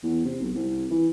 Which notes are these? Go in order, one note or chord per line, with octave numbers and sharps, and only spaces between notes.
E2
C3
B1
C2
E3